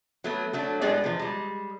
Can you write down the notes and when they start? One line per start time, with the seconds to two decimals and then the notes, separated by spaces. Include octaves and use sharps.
0.24 F#3 A3 B3
0.53 F#3 A3 D4
0.81 A2 G#3 B3 G4 G#4 D5
1.04 E2 B2 F3
1.19 G3 G#3